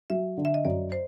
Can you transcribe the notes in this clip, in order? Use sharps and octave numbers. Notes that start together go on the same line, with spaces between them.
F#3 E5
D3
E5
D#5
F#2 D5
C5